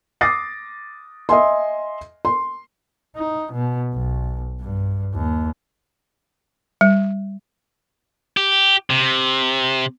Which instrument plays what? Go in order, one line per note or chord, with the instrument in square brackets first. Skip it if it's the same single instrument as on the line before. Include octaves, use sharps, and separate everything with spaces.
[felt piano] D6 D#6 A6 A#6 C7
D#5 E5 G#5 C6
C6
[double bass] D#4
B2
B1
G2
D#2
[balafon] G3
[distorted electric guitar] G4
C3